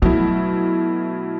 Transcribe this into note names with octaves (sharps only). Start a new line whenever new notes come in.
B2 F#3 A3 E4